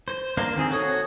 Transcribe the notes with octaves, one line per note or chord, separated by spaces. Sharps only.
C5
A#3 D4 A#4 C5
D#3 C4 G#4
F#4 A4 C#5 D#6